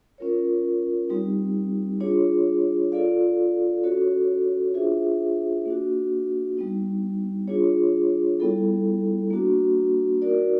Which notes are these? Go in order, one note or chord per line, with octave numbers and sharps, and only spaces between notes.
C#4 F4 A#4 C#5
G3 C4 D#4 G4
D4 F4 G#4 C#5
F4 A4 D5 F5
C#4 F#4 A4 C#5
D4 F4 G#4 C5 E5
A#3 D4 F#4
G3 B3 D#4
D4 F4 G#4 C#5
G3 B3 E4 A4
A#3 D4 F#4
D#4 F#4 A#4 D5